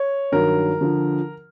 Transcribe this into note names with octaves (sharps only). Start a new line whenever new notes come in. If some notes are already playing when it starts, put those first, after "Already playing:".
Already playing: C#5
G2 D#3 F#3 A#4
D3 F3